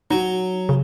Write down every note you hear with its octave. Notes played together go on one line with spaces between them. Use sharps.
F#3 D#4
C#3